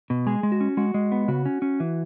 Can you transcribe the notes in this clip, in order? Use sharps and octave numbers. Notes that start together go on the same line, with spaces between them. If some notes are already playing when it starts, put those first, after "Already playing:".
B2
G#3 G#4
G#3
F#4
C#4
G#3 F#4
G#3
B3
C#3 F#4
C#4
C#4
E3